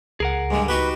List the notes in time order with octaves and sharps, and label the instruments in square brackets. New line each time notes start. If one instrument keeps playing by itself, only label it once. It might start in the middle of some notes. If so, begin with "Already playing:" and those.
[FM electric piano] C#2 [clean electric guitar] G#4 A#4 F#5
[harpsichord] G2 D3 [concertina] G#3
[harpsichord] D#4 F#4 G4 [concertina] B4